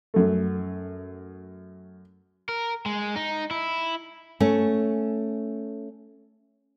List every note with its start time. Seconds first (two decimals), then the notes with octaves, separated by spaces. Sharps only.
0.14 F#2 A3
2.49 A#4
2.86 G#3
3.16 D#4
3.51 E4
4.40 A3 C#4